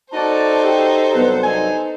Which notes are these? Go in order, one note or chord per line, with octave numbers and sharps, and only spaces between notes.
D#4 F#4 A4 C5 D5 A5
G4
C2 G2 F#3 B3 B4
D#4 G#5